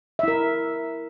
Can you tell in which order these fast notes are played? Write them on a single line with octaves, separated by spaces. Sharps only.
E5 E4 A#4